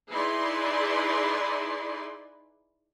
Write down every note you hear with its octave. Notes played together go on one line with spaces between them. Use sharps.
D#4 E4 G#4 B4 D5 C6